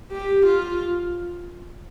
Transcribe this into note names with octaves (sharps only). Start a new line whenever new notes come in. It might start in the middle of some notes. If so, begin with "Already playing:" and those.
G4
F4